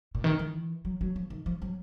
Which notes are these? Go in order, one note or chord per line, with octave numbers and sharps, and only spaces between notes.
A#2
D#3
E3
F#3
F#3
F3
D#3
F3
F#3